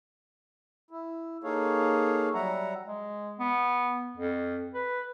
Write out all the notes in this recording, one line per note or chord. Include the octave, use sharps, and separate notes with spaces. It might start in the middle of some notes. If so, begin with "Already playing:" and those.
E4
A#3 D#4 G#4 A4 C#5 F5
F#3 G3 E5 F#5 A#5
G#3
B3
F2
B4